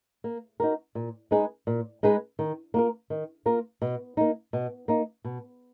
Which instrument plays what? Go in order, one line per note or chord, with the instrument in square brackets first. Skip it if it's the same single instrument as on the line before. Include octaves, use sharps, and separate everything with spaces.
[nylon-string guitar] A#3
D#4 F#4 A#4
A#2
G#3 D#4 G#4 B4
A#2
G#3 D#4 G#4 B4
D#3
A#3 F4 A#4
D#3
A#3 F4 A#4
B2
A#3 D#4
B2
A#3 D#4
B2